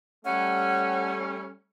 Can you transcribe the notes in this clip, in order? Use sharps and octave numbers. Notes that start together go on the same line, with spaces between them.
G3 A3 C#4 F#5